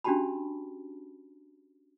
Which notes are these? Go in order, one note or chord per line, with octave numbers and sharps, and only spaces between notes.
C#4 D4 F#4 G4 A5 B5